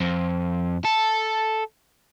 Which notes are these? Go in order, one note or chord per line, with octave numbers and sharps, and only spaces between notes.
F2
A4